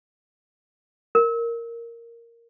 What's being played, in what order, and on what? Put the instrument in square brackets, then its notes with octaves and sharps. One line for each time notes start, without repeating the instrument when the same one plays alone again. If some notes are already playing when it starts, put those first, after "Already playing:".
[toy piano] A#4